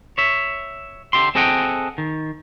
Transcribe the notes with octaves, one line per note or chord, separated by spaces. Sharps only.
C#5 E5
D3 G4 E5 C6
C4 G#4 A4 D#5 F#5 G5
D#3